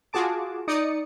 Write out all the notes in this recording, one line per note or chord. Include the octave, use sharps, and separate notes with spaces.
F4 F#4 G#4 A5 D6
D#4 D5 D#6 C#7